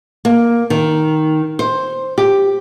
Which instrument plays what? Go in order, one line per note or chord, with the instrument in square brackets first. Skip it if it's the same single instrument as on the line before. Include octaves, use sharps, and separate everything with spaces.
[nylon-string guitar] A#3
D#3
C5
G4